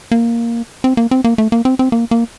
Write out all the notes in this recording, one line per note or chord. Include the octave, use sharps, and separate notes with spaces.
A#3
C4
A#3
C4
A#3
A3
A#3
C4
C4
A#3
A#3